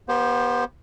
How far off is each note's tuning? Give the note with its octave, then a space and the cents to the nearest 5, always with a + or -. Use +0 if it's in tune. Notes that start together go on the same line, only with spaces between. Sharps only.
B3 -30 G4 +0 C5 +5